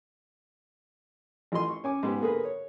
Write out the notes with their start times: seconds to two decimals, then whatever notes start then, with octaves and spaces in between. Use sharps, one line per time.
1.52 A1 F4 D#5 C6
1.69 C#6
1.84 C#4 G#5 D6
2.03 G#2 G#3 B3 G4
2.21 D3 A#3 G#4 A#4 B4
2.45 C#5